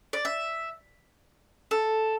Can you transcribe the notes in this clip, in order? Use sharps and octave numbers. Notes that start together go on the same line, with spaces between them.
D5
E5
A4